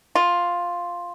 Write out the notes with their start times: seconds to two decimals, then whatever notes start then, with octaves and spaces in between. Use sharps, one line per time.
0.15 F4